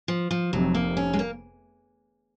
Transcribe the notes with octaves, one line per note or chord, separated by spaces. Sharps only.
F3
F3
F1 F2 C3 F#3
A#3
C#4
G#3
A#3